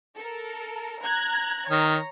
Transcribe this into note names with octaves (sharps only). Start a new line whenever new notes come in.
A4 A#4
A#5 F#6 G#6
D#3 C#5 A#5